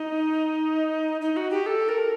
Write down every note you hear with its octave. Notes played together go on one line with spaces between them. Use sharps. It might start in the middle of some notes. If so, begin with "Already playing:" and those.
Already playing: D#4
D#4
F#4
G4
A4
A#4